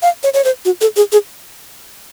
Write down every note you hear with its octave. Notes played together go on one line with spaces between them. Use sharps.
F5
C#5
C#5
C5
F#4
A4
G#4
G#4